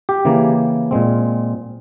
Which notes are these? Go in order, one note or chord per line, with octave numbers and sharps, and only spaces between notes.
G4
C#3 E3 A#3
A#2 G#3 C4